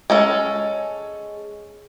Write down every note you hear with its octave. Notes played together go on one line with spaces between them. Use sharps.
G#3 C#4 A4